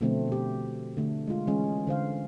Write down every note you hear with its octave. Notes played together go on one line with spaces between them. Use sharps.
B2 D3 F3 A3 C4
B2 G4
D3 A3
G#3 F4
E3 G#3 C#4
D3 C5 F5